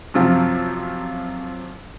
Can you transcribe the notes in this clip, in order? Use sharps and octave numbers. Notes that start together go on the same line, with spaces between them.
F#2 C3 F3